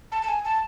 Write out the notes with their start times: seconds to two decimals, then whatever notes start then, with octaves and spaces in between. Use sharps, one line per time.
0.12 A5
0.22 A5
0.28 G#5
0.45 A5